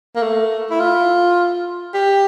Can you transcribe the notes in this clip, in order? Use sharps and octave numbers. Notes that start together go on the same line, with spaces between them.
A#3
A3
E4
F4
G4